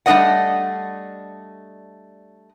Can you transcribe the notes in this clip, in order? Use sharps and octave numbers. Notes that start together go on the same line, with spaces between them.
G3 A3 D4 D5 D#5 F#5